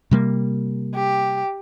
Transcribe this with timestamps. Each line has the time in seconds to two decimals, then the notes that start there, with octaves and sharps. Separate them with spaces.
0.11 C3 G3 A#3
0.95 G4